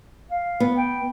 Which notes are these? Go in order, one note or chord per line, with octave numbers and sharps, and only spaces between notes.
F5
B3
G5